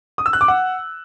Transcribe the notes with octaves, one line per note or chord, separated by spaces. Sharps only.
D#6
E6
F#6
D6
F#5